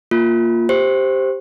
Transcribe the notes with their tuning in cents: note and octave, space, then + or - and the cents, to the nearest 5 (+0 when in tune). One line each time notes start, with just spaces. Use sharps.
A#3 +0 F4 +0
G4 +0 C5 +0